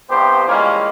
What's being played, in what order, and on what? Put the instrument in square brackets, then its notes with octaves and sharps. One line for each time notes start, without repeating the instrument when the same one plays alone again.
[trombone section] C2 G2 B3 G4 C5
E3 G3 G#3 A#3 C#4 F4